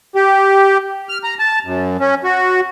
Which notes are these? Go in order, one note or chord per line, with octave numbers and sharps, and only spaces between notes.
G4
F6
A#5
A5
F#2
C#4
F#4